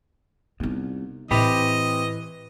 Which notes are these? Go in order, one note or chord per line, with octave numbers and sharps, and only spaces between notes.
C2 B3 D#4
A2 E3 C4 G4 D#5 B5